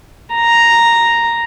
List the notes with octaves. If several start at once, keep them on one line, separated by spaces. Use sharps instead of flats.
A#5